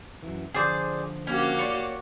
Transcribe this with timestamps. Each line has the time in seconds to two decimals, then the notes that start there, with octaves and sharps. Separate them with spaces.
0.23 F#2 E3
0.54 D3 F3 G#4 C5 D5
1.27 A#3 C#4 F#4 G4
1.59 C#5 D5